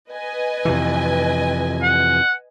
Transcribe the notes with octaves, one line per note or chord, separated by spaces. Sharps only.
B4 D#5 G#5
F2 C3 E3
F#5